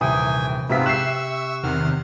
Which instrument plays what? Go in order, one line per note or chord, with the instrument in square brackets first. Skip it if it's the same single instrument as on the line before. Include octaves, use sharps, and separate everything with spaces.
[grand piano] D#1 E3 D#6 [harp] C3 [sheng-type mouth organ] G5 G#5
[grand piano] G#2 C3 B6 [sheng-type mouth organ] B3 C4 F4 [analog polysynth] E5
[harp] G4 E7 [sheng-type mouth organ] C#6 E6 [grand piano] F#6 C7
[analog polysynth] E2 C3 D#3 [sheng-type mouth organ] F#5 F6